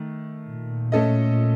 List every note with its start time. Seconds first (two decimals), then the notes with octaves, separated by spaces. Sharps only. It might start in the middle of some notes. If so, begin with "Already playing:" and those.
Already playing: D#3 A3
0.48 A#2
0.92 A3 C#4 A4 D#5